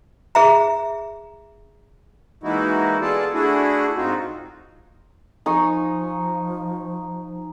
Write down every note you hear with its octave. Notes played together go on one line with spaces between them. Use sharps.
G#4 E5 A#5
E3 G#3 A#3 D#4 E4 F#4
B3 F4 G#4 A4 D5 A5
A3 D4 E4 F#4 G#4
G#2 C4 D#4 F4 F#4
F3 D#4 G#5 C#6